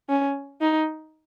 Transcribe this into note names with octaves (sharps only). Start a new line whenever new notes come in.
C#4
D#4